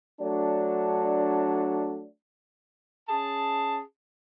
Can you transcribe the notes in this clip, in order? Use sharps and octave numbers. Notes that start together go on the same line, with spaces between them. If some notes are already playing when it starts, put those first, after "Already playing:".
F#3 A3 D4
C#4 G#4 A5